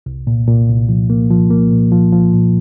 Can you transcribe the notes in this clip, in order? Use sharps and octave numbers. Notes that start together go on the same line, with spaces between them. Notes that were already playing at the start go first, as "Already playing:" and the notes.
C2
A#2
A#2
C2
F3
A#3
F3
A#3
A#2
F3
F3
A#2